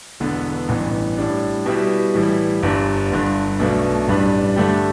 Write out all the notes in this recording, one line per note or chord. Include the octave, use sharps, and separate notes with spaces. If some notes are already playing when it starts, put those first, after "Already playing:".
E1 E2 D3 B3
A1 G2 E3 B3
A2 G3 D4
B2 G3 E4 G4 B4
A2 E3 G3 E4
G1 G2 G3 D4
G1 G2 D3
B1 B2 A3 D4
A1 G2 G3 D4 B4
G2 D3 A3 D4 G4